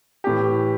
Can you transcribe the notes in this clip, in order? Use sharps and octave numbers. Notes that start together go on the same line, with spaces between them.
A2 E3 G4